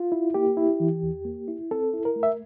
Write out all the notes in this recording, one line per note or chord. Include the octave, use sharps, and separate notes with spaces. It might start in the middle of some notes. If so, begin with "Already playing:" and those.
Already playing: F4
E4
A#3 G4
E4
E3
E2
A#3
E4
C4 A4
E4
A#4
A3
E5